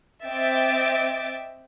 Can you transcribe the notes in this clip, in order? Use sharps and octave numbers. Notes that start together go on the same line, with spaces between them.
C4 D#5 E5 G5 D6 A6